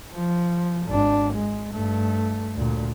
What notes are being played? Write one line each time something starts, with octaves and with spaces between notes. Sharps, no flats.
F3
G#1 D4
G#3
G2 A3
D2 A#2